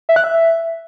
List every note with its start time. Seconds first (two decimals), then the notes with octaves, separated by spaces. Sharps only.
0.09 E5
0.16 F#6
0.24 E5